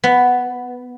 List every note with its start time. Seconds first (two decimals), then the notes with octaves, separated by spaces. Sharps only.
0.04 B3